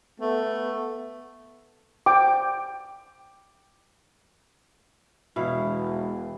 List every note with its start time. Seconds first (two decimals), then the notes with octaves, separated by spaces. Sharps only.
0.20 A3 B3
2.06 G5 D6
5.36 E1 B2 E4 F5